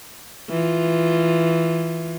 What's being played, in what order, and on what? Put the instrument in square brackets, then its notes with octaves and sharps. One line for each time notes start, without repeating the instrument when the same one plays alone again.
[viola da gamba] E3 F4